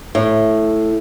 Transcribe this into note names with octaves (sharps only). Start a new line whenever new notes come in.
A2